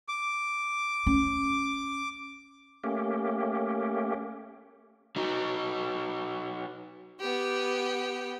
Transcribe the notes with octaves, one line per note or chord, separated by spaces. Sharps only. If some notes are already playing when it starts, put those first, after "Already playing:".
D6
C#4
A3 A#3 C#4 G4
F#3 D#4
B3 G4